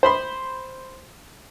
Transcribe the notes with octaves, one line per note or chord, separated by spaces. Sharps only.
C5 B5 C6